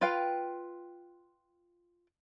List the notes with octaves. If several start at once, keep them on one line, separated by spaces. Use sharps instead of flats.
F4 B4 F5 G5